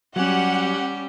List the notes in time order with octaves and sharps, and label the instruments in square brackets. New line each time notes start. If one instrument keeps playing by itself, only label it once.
[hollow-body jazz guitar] F#3 [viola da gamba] G3 G4 [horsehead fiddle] C#4 [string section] F#5